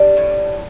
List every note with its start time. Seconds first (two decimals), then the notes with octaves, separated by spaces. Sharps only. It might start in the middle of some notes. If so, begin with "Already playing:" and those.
Already playing: G3 D4
0.17 A2